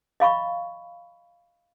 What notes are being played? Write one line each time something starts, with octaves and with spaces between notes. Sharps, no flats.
D#5 F5 B5 C#6